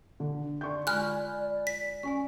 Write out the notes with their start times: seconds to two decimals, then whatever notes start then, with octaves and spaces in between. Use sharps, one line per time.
0.20 D3
0.61 D5 C6 C#6 G6
0.87 D3 G#3 F4 G#5 B5 F6 F#6
1.67 B6
2.03 C#4 D5 G#5 C#6